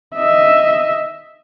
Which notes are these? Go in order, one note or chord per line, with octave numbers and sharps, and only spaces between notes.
D#5 E5